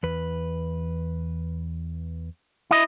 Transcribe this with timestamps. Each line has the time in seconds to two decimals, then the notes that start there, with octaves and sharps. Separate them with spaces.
0.03 E2 B4
2.71 E4 D#5